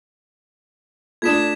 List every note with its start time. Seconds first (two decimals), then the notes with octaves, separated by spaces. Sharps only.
1.22 A3 D4 F4 A4 G#6 B6 E7